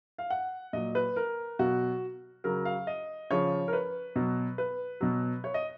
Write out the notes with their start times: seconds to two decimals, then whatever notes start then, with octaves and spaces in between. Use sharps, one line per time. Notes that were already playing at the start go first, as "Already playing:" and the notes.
0.18 F5
0.30 F#5
0.73 A#2 F#3 D#5
0.95 B4
1.16 A#4
1.59 B2 F#3 F#4
2.44 C#3 F#3 A#4
2.65 F5
2.87 D#5
3.31 C#3 F3 C#5
3.68 A#4
3.73 B4
4.16 B2 F#3
4.58 B4
5.01 B2 F#3
5.44 C#5
5.54 D#5